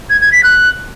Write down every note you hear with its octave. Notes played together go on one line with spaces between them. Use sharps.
G#6
G#6
B6
F#6